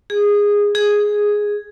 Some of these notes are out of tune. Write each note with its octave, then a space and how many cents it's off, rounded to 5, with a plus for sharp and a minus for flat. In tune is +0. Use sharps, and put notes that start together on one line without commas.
G#4 -15
G#4 +0